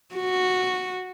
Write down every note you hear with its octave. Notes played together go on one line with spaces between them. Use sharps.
F#4